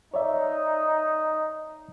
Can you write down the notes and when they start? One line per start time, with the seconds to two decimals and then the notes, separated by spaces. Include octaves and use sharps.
0.14 D#4 C#5 D5 E5